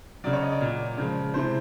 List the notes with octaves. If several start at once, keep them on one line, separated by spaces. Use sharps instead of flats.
C#3 F#3 D5
C#5
D#5
D5
A#2 F#3
C#3 F3 G#3
C3 E3 G#3 C5